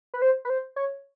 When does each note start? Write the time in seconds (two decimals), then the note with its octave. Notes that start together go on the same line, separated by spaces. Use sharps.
0.14 B4
0.22 C5
0.45 B4
0.50 C5
0.76 C#5